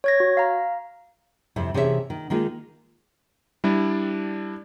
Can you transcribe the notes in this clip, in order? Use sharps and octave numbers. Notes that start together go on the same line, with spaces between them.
C#5 G#6 A#6
F#4
F5 A#5
F2 C3 E4
C3 E3 C#4 G#4 C#5 E5
D#3
D#3 G#3 A#3 D#4 F4
G3 D4 E4 D5